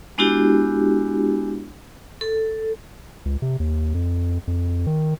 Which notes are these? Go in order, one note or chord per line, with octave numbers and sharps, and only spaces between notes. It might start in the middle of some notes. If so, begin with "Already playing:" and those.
G#3 B3 D4 E4 F#4 G4
A4
C#2
C3
D#2
F2
F2
D#3